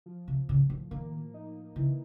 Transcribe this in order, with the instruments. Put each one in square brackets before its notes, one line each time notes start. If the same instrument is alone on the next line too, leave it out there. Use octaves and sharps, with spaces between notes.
[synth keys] F3
[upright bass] C3
[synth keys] A2 [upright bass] C#3
[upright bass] D#3
[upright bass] D#3 [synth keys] A#3
[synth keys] D#4
[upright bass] C#3 [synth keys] E3